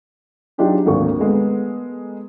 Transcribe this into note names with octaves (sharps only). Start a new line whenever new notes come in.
F#3 D4 D#4 F4 G4 G#4
G#1 D2 A#3 C#6
G#3 A3 B3 A#4